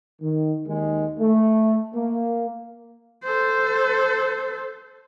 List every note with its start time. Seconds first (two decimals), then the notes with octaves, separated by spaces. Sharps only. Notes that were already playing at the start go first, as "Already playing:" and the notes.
0.21 D#3
0.67 D#2 D#3 G#3
1.19 A3
1.95 A#3
3.24 A4 C5